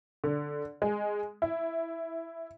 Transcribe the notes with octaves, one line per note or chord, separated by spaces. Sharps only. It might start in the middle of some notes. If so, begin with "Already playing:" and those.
D3
G#3
E4